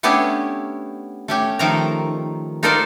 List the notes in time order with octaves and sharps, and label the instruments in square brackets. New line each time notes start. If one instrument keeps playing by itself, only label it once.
[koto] A3 B3 C#4 D4 E4 G4
A3 C#4 G4
D#3 F3 A3 A#4 A#5
D#4 F4 A4 A#4 C5 D5